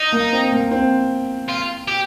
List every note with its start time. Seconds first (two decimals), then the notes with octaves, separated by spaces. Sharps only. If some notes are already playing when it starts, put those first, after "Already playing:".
Already playing: D#4
0.12 A#3
0.33 C4
0.52 A#3
0.71 C4
1.49 F4
1.88 G4